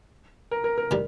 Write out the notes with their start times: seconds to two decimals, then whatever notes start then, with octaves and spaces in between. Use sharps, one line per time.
0.51 A#4
0.64 A#4
0.78 A#4
0.91 D#3 G3